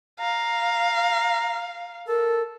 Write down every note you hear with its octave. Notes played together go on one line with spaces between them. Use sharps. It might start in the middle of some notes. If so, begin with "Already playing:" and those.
F5 A#5
A4 A#4